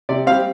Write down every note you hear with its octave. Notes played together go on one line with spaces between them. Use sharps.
C3 D5
G3 C4 F5